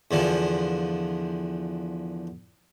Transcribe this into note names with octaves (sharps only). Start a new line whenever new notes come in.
E2 D3 F3